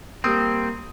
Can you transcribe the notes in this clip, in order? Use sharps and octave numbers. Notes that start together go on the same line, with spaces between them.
G3 A#3 C4 D#6